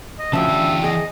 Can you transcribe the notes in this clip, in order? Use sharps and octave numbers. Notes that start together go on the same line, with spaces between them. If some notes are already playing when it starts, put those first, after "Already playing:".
D#5
D2 C#3 F3 E5 G5 A5
E3 D5
G#4 D#5